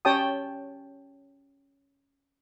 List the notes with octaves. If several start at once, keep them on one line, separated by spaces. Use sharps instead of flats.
C#4 G4 C#5 G5 A5 D#6